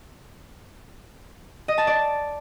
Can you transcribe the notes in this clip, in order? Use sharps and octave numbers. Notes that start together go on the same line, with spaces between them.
D#5
A5
D5